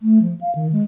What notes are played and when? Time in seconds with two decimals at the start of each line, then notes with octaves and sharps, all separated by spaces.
0.02 A3
0.22 F3
0.41 F5
0.55 D#3
0.73 G#3